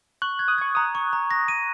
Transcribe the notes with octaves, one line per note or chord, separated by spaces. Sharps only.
C#6 F#6
G#6
D#6
C#6 G#6
A#5 D#6
C#6
A#5
A#6
D#7